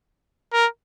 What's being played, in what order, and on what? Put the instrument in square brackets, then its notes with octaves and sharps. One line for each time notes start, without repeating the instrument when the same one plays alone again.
[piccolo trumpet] A#4